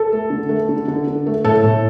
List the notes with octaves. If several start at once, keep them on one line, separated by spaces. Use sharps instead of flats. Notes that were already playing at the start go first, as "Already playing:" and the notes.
Already playing: A4
A3
D3
A3
D3
D3
D3
A3
A2 A4
A2